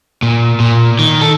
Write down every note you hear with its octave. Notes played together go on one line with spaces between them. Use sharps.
A#2
A#2
D#3
A4